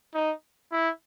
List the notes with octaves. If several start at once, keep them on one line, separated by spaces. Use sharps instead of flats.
D#4
E4